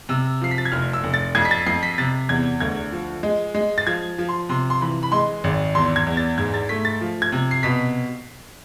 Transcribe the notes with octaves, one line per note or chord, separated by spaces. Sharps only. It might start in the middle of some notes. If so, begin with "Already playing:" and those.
C3 E6
F3 C7
B6
A6
G#6
F1 F6
E6
F1
A6
F2 G#6
B6
A6
F2 C7
B6
C3 A6
E2 G#6
D2 G#6
F3
G#3
G#3
A6
F3 G#6
F3
C6
C3 C6
C6
E3 B5
B5
G#3 C6
G#1
E2 C6
G#6
E2
A6
G#2 G#6
A6
A3 B6
A6
F3
G#6
C3
C7
B2 B6